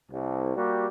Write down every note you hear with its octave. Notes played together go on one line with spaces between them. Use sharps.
C2
G3 A#3 F#4 G4